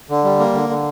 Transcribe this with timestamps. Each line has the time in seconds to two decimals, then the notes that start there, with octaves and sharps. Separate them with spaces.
0.09 D3
0.24 G3
0.39 A#3
0.54 D3
0.69 D3